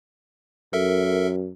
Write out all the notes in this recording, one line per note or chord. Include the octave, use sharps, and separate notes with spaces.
F#2 A4 A#4 E5